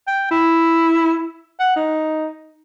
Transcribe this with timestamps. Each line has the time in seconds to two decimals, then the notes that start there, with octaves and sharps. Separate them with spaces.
0.07 G5
0.31 E4
1.60 F#5
1.76 D#4